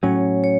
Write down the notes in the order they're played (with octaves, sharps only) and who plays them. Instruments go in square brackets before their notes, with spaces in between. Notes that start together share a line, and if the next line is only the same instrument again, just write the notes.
[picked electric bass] A2 F#3 C#4 [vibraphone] C#5
[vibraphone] C#5